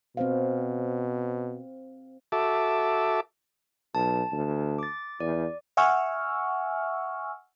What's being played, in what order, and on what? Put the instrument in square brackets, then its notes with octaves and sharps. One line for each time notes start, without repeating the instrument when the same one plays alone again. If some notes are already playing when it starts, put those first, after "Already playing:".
[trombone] B2 [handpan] C4 C5 F5
[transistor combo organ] F#4 A4 E5 A5 D6
[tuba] B1 [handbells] A5
[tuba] D2
[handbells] D6 A6
[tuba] E2 [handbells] D5
[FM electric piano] E5 F#5 G#5 C#6 E6 F6